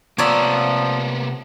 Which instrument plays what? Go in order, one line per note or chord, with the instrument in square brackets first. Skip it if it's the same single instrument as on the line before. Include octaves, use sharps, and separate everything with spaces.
[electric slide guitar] C3 A#5 [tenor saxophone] F3 [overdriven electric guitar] A#3 B3 [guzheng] C#5 D5 E5